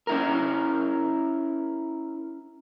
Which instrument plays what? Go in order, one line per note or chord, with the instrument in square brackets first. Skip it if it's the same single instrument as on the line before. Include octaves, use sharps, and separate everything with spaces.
[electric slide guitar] C#4 E4 A#4